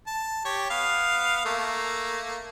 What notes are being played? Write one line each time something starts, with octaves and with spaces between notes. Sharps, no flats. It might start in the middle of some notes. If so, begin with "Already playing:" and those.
A5
G4 C#5
B3 F5
A3 A#3